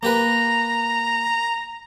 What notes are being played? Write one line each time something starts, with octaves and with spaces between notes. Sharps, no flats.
A#3 G4 B4 A#5